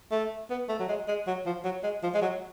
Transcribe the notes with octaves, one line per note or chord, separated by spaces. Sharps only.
A3
B3
A3
F#3
G#3
G#3
F#3
F3
F#3
G#3
F3
G#3
F#3